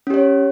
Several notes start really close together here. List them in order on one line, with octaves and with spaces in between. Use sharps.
C#4 G4 C#5